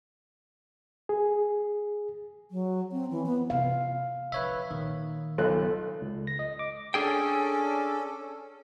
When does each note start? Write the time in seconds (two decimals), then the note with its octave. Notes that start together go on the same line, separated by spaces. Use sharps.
1.09 G#4
2.51 F#3
2.92 C4
3.11 E3
3.26 B3
3.50 C3 F4 F5
4.32 D3 F3 B4 C#5 E5
4.71 A#2 D#3
5.38 B1 F4 A4 F#6
6.02 C#2
6.27 A#6
6.39 D#5
6.59 D6
6.94 C#4 D4 G#4 A4 G5